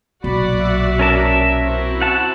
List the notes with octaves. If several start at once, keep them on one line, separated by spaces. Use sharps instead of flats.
B1 A#2 F#4 D5 F#5 B5
E5
C#4 A#4 A5
C4 E4 F#4
F#5 A5